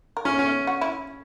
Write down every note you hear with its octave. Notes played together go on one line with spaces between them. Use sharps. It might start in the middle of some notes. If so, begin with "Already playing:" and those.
A#4
C#4 G#4
C#4
F#4
E4